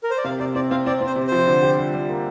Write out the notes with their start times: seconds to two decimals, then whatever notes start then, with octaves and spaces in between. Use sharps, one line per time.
0.04 A#4
0.10 C5
0.18 D5
0.25 C3 F5
0.40 C3 D5
0.55 C4 D5
0.71 C4 F5
0.86 C4 D5
1.01 C4
1.06 C5
1.16 C3
1.27 F3 C5
1.47 D3
1.62 G4
1.78 G3
1.94 G3
2.09 A#3